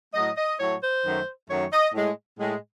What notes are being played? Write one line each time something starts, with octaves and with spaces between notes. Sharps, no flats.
A2 F#3 A3 D#5
D#5
A2 F#3 A3 C#5
C5
F#2 D#3 F#3 A3
F#2 D#3 F#3 A3 C#5
D#5
A2 G#3
A2 G#3